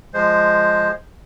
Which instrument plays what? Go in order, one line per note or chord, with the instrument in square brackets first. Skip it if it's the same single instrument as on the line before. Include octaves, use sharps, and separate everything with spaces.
[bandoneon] F3 G#3 C5